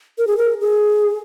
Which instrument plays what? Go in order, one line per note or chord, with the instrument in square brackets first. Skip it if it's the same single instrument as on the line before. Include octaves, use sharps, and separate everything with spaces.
[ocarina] A#4
G#4
A#4
G#4